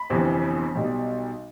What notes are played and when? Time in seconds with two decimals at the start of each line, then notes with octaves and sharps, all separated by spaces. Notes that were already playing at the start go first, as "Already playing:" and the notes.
Already playing: B5
0.10 G1 F2 C3 E3
0.75 B1 B2 G3